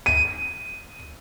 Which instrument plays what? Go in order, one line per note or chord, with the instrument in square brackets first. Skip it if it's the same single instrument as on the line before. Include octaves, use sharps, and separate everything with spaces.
[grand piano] D#7